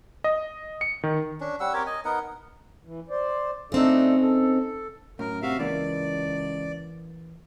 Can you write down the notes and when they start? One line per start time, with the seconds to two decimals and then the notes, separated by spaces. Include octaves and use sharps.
0.24 D#5
0.81 C#7
1.03 D#3
1.41 C#4 D4
1.60 G3 C#4 F#5 E6
1.74 C4 G4 A#4 C#5
1.86 D#5 G#5
2.05 B3 D#4 A#4 F#5
2.85 E3
3.10 C5 D5
3.72 C#3 A3 C4 D4 D#4 A4
4.20 A4
5.19 F#2 A2 A#4
5.42 C3 F#4 E5 F5
5.59 C#2 E3 A#3 D5